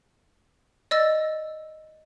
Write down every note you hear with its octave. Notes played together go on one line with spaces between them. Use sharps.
D5 D#5 E6 A6